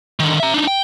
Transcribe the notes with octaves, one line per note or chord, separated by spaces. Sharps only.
D3 D#3
E5 A#5
D4 D#4
G5